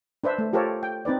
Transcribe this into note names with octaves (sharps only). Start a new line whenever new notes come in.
D4 B4 C5 E5
A3
F4 G4 A4 A#4 C5 C#5
G5
C4 D#4 B4 D5